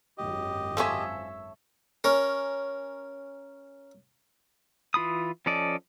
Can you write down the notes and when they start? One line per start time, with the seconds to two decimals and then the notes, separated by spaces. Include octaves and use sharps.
0.18 G#1 F#2 G4 D#5
0.77 F3 C#4 A4 C#5 E5
2.04 C#4 A#4
4.94 E3 F4 B5 D#6
5.46 F3 C#4 A4 D5 D#5